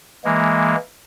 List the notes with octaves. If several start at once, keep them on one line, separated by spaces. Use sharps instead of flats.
E3 G#3 A#3